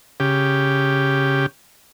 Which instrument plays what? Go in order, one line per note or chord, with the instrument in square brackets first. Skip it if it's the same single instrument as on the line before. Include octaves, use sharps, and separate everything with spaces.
[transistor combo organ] C#3 G4